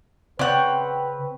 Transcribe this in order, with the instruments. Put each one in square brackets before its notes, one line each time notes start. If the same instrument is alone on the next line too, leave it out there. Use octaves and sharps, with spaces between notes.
[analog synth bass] C#3 [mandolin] C4 C#5 G5 [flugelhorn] B4 [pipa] D5 F#5